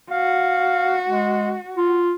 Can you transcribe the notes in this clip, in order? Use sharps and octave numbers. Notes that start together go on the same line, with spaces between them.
F#4 F5
G#3
F4